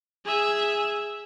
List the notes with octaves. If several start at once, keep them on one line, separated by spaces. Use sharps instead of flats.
G#4 E5